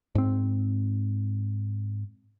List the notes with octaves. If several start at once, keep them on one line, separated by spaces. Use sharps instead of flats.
G#2 C4